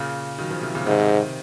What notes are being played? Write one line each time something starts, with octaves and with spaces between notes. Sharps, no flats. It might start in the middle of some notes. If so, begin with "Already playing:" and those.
Already playing: A#2 C#3
D#3 F#3
C#3 F3
C3 D#3
A#2 C#3
G#2 C3 D#3